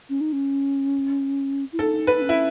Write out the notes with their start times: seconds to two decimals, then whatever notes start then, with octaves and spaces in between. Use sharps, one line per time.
0.10 C#4
0.21 D#4
0.33 C#4
1.73 E4
1.79 D#4 A4
2.07 B4
2.16 D#4
2.22 C#4
2.29 E4